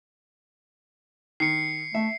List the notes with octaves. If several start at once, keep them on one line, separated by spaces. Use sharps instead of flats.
D#3 C7 C#7
A3 E5